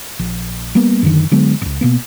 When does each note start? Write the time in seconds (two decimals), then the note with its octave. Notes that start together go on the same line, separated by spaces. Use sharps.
0.19 A#1
0.75 G3 A#3 B3
1.03 F#2 D3 D#3
1.31 D3 F#3 G#3 B3
1.61 E1 C#2
1.81 B2 A#3 B3